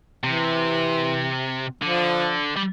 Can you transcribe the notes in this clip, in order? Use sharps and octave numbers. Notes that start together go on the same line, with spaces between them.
C3 E3
D3 F3
G3